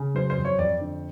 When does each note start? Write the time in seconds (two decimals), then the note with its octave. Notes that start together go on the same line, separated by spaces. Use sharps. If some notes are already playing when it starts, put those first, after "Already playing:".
Already playing: C#3
0.15 F#3 C5
0.30 C5
0.37 F2
0.45 C#5
0.58 F2 D5
0.81 D3